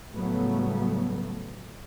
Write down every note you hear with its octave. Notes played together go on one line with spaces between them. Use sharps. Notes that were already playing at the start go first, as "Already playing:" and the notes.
A2 C#3 F#3 G3 A3 B3